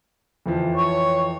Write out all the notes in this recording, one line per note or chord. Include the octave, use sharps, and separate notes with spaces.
F2 E3 F3
C#5